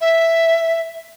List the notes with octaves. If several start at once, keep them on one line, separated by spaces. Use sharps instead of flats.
E5